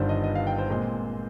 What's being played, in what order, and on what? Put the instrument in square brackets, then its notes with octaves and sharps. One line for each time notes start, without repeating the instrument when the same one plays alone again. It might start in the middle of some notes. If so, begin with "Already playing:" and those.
Already playing: [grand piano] G1 G2 D#3 G3 D4 C5
D#5
D#5
F5
G5
C5
A#2 G#3 C4